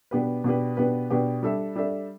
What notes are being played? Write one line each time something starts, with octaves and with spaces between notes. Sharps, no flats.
B2 B3 D4 G4 B4
B2 B3 D4 G4 B4
B2 B3 D4 G4 B4
B2 B3 D4 G4 B4
G3 D4 A4 E5
G3 D4 A4 E5